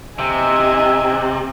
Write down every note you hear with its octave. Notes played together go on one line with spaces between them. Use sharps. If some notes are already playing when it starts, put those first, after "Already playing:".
C3 D#5 E5 G#5